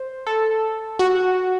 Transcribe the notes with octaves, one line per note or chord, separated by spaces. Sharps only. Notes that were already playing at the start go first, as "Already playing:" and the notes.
Already playing: C5
A4
F#4